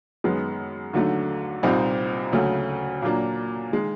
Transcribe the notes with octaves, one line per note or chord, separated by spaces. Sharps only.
F#2 D#3 G#3 B3
D#2 D3 F#3 A3
C2 A#2 G3 C4 D#4
D2 C#3 F#3 A3
A#2 F#3 A#3 D4
D#3 G#3